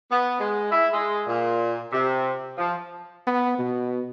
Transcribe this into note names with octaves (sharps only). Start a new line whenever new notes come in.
B3
G#3
E4
G#3
A#2
C3
F3
B3
B2